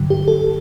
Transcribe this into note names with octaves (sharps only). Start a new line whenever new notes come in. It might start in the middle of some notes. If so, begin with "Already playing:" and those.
Already playing: G2 D3 F#3
G4
A4